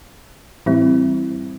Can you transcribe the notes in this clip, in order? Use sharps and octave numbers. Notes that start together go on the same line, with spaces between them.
A2 E3 G3 C4 E4